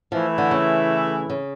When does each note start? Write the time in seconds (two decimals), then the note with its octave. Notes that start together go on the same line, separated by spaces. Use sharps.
0.12 E3 F3 A3 E4
0.38 D3
0.51 C#3
1.30 C#3